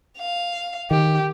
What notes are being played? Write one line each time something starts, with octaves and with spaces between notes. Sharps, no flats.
F5
D#3 G4